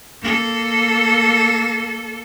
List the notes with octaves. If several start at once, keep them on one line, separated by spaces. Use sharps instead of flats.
A#3 A4